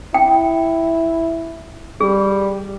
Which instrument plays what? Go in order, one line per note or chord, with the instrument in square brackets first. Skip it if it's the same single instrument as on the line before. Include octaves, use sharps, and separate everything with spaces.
[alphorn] E4 [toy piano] G5
[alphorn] G3 [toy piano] G#4